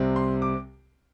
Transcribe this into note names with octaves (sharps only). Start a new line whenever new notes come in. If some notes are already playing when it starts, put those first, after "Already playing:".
Already playing: C2 C3 G3 C4
C6
D6